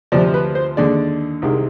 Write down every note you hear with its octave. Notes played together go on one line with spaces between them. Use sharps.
D2 C3 F3 D5
B4
C5
D#2 D3 G#3 D5
C2 C3 D#3 G#3